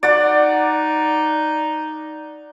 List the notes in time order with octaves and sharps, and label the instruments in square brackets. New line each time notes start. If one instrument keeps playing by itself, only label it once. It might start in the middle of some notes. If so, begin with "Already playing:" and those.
[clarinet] D#4 [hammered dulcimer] D5 F#5 D6